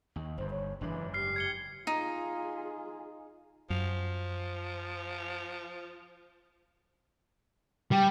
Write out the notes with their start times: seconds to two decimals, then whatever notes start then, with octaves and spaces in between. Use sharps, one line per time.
0.16 D#2
0.38 G1 G2 C5
0.50 C#5
0.81 F#1 G#2 E3 D4
1.14 G4 F6 C7
1.36 G#6 C#7 G7
1.87 D#4 F4 G#4
3.70 F#2 F3
7.92 G3 G5